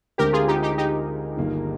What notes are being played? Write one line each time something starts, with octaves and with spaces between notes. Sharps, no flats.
D2 D3 G#3 C4 G4 A#4
F4 G#4
D#4 G4
D#4 G4
D#4 G4
G1 G2 D#3 A#3 D4